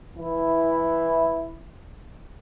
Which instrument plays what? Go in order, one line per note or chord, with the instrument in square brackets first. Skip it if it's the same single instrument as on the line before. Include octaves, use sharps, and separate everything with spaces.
[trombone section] E3 E4